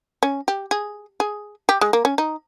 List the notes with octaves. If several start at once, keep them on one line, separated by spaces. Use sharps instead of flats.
C#4
G4
G#4
G#4
G4
G#3
A#3
C#4
D#4